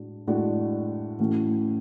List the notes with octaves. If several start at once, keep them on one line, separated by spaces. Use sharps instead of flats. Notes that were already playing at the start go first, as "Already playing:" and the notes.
Already playing: A2 G#3 D4 F#4
A2 G#3 D4 F#4
A2 E3 A3 C#4 F#4